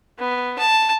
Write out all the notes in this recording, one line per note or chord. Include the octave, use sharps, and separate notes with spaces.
B3
A5